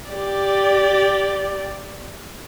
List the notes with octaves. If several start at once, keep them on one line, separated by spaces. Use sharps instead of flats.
G4 D5